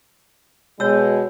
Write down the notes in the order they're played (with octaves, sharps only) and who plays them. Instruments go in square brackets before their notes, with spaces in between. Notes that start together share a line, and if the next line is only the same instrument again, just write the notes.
[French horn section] B2 G#3 [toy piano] C#5 E6